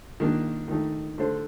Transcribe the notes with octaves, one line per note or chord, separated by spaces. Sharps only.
D#3 A#3 D4
D#3 A3 D#4
D3 A3 D4 A4 C5